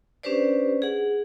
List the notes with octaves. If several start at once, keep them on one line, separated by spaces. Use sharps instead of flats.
C#4 D4 G4 B4 C5 D5
G#4 F#5